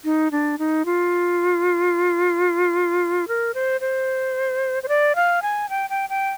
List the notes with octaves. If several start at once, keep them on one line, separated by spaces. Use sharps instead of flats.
D#4
D4
D#4
F4
A#4
C5
C5
C5
D5
F5
G#5
G5
G5
G5